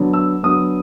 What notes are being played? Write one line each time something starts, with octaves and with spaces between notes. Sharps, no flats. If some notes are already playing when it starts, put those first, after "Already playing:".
Already playing: D3 F#3 B3
E6
D3 F#3 B3 D#6